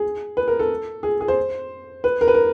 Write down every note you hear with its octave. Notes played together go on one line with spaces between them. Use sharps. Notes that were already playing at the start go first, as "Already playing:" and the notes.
Already playing: G#4
B4
A#4
A4
G#4
G#4
C5
B4
A#4
B4
A#4